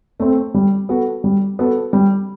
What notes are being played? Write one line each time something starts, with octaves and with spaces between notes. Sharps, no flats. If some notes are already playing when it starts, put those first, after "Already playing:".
A3 C4
G3
B3 F#4 A4
G3
B3 F#4 A4
G3